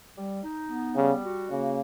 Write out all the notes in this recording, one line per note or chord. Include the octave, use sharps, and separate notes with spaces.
G3
D#4
B3
C#3 G3
F#4
C#3 A#3